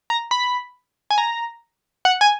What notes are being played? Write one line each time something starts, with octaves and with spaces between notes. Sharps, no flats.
A#5
B5
G#5
A#5
F#5
G#5